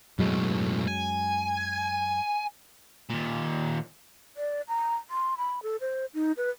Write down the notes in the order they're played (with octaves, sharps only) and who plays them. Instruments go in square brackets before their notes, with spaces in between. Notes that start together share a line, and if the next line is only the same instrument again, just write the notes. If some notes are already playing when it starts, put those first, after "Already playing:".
[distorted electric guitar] B1 A2 [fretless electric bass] F#2 F#3 G#3
[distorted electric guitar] G#5
D#2 A#2
[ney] D5
A#5
C6
B5
A4
C5
D#4
B4